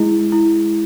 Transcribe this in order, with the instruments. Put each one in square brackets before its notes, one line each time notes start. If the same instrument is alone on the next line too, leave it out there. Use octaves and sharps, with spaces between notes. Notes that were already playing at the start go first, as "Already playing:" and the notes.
Already playing: [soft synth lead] G#3 [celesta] E4
[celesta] E4